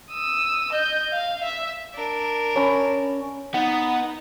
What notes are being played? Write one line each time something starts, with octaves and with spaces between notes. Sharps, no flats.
D#6 E6
D#5 G6
F5
E5
D4 A#4
C#4 B5
B3 D#4 F#5